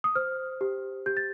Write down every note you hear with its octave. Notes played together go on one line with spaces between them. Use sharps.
D#6
C5 F6
G4
G4 G6
A6